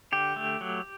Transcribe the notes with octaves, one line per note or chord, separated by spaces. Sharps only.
D3 G4
A3
F#3